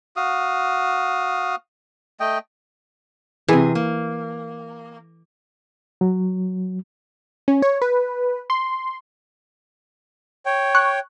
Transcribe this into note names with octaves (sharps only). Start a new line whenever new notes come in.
F#4 F5 D#6
A3 D#5 G5
C3 E3 G#4
A#3
F#3
C#4
C#5
B4
C6
C#5 G5
C#6 F#6